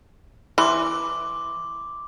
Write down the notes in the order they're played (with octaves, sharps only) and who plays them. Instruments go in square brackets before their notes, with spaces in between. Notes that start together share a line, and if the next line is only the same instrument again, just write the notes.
[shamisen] E3 [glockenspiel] C6 D6